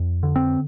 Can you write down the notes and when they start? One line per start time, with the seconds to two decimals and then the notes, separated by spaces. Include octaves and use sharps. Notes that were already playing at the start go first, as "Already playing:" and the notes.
Already playing: F2
0.23 D3
0.36 C4